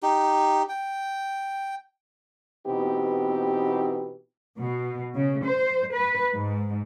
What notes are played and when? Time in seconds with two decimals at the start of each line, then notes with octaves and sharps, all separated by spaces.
0.03 D#4 G4
0.69 G5
2.67 B2 E3 B3 C4 D#4 G4
4.59 B2
5.15 C#3
5.44 C5
5.92 B4
6.32 G#2